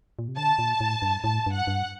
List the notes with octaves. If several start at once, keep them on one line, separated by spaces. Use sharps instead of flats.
A#2
C3
D3 A5
A#2
A2
G2
A2 A5
G2
F#5
G2